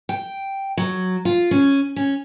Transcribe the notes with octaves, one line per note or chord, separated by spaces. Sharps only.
G5
F#3
F4
C#4
C#4